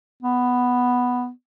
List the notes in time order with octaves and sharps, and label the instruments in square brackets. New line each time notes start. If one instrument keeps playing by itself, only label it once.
[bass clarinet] B3